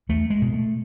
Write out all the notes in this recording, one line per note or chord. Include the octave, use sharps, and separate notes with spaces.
E2 A3
G#3
B2
A3